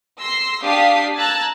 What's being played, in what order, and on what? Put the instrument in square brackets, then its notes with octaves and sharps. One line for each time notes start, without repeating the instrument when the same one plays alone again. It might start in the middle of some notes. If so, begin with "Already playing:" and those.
[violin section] C6 E6 A#6 C7
D4 G4 F5 D#6 B6 C7
A5 A#5 E6 F#6 G#6 A6